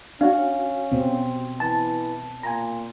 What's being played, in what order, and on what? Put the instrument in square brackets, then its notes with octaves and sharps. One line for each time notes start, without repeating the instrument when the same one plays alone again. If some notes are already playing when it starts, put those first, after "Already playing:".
[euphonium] C#4 [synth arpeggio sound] D4 [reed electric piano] F#4 F5
[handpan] B2 C4
[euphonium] E3 [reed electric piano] A5
[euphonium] A#2 [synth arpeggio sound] G#5 A#5